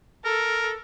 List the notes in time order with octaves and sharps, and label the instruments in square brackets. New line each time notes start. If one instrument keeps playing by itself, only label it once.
[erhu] A4 [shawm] A#4